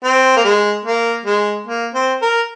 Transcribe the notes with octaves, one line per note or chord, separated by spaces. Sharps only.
C4
A#3
G#3
A#3
G#3
A#3
C4
A#4